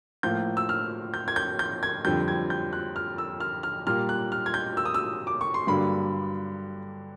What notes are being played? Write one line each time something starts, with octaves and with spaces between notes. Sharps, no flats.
A2 F3 A#3 G6
E6
F6
G6
G#6
G6
G6
G#6
F2 D3 G3 G6
G#6
G6
F#6
F6
E6
F6
F6
A#2 G3 A#3 F6
F#6
F6
G#6
G6
E6
D#6
E6
D6
C#6
C6
G2 D3 F#3 A#3 B5